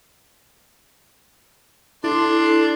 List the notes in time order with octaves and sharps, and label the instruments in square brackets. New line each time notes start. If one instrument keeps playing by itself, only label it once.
[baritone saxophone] D4 [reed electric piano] E4 [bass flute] A4 [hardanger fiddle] C6